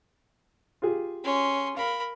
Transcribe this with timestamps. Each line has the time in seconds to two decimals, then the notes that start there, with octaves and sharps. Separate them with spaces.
0.82 F4 G4 G#4
1.24 C#4 C6
1.77 A#4 F5 B5